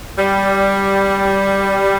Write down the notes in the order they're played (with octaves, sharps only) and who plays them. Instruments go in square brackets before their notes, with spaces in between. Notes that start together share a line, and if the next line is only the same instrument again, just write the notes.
[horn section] G3